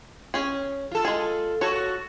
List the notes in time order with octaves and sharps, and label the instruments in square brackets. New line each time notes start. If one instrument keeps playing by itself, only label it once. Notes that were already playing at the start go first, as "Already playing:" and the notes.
[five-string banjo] C#4 G#4
[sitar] F4 A4
[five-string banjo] G#3 G#4
[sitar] F#4 A4 [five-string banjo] C#5